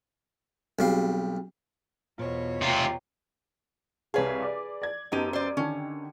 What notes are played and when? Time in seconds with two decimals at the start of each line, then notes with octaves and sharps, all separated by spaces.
0.79 B1 G3 C4 F#4 G#4 F5
2.18 E2 B2 F4 C5 C#5
2.61 C3 F4 D5 G5 A#5
4.14 C2 G#4 B4 C#5 F5
4.42 D5 D6
4.82 D5 G#6
5.12 F#2 B3 D#4 G4 D#7
5.33 C5 D5
5.57 D3 D#3 C#4